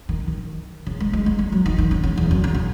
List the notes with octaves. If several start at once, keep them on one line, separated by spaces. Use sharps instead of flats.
D#3
D#3
C#3
G#3
G#3
G#3
G#3
F#3
D#3
D#3
C#3
C#3
E2
F#2
C#3
C#3